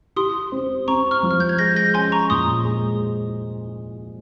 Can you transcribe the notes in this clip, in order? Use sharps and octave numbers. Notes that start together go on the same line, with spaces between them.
G4 C6 D#6
C4
C4 A#5 C#6
C#6 F6
F3
F6
G6
G#6
G#3 G6 A#6
G6 A#6
C#4 G#5 C6
A#5 C#6
A#2 C6 D#6
G#3